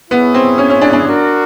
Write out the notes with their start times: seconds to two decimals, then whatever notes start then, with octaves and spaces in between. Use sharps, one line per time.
0.11 B3 E4 G#4 C#5
0.34 C4
0.58 C#4
0.70 C#4
0.81 D4
0.93 D4
1.04 F#4 A#4 D5